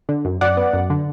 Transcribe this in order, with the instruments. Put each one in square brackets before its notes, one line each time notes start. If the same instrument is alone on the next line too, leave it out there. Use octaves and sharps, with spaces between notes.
[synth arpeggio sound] D3
F#2
F#2 D5 F#5
B3
F#2
D3